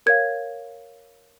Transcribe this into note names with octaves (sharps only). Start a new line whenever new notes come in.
A#4 C#5 F5 G#6